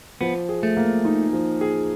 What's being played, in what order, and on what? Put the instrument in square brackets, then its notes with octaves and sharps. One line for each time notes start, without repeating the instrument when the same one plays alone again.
[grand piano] F3 [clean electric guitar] B3
[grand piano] G#4
[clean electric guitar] A3
[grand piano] A#3
D#4
F3
G#4